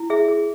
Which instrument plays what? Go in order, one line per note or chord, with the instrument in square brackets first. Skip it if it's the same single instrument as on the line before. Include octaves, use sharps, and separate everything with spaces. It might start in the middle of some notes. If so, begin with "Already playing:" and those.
Already playing: [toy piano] E4
G#4 E5
G#4